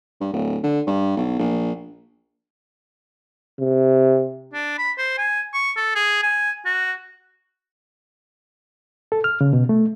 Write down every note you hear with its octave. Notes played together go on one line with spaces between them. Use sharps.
G2
D1
D3
G2
B1
A#1
C3
D4
B5
C5
G#5
C#6
A4
G#4
G#5
F#4
A4
F6
C#3
B2
A3